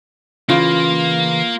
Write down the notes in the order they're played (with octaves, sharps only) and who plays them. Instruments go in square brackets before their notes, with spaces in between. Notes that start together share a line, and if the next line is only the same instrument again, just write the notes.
[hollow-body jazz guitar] C#3 E3 [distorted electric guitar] A#3 [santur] F4